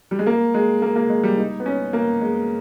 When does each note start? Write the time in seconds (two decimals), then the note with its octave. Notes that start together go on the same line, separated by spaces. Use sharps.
0.11 G3
0.19 G#3
0.26 A#3
0.54 G#3
0.82 A#3
0.96 A#3
1.10 G#3
1.23 G3
1.37 D#4
1.60 B3
1.66 C#4
1.93 A#3
2.21 G#3